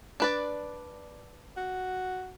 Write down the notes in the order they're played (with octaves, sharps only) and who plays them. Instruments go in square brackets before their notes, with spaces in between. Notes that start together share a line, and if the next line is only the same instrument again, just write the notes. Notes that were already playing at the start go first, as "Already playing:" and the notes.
[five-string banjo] D4 B4 D5
[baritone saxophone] F#4